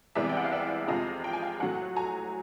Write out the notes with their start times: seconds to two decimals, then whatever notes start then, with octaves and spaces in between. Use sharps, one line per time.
0.15 C2 C3 E3 G#3 B3 D5 E5
0.29 G5
0.37 F#5
0.44 F5
0.52 D5 E5
0.88 F2 C3 F3 G#3 D#5 F5
1.24 G5
1.33 G#5
1.42 F5 G5
1.60 A2 F#3 A3 F#5 G#5
1.96 G#5 A#5